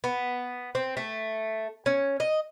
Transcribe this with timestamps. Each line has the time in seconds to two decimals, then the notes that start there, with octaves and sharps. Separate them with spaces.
0.04 B3
0.75 C4
0.97 A3
1.86 C#4
2.20 D#5